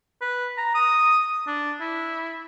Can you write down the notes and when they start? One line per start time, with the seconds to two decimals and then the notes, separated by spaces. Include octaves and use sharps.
0.22 B4
0.58 A#5
0.75 D#6
1.47 D4
1.80 E4